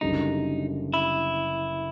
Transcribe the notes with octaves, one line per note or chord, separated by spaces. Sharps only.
F#1 F#2 D3 G3 D#4
E4